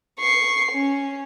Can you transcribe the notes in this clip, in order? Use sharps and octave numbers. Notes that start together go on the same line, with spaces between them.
C#6 C7
C#4